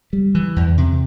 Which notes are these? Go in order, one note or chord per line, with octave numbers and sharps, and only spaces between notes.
G3
E3
E2
C3